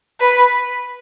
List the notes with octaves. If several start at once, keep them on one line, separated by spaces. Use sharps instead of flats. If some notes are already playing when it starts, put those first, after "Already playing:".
B4